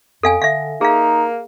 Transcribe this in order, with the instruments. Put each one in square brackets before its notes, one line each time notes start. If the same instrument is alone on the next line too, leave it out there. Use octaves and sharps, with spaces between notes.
[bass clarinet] F2 [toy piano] A4 F5 G#5
[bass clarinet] D3 [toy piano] E5 F5
[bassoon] A#3 [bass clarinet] D#4 [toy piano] G#4 F5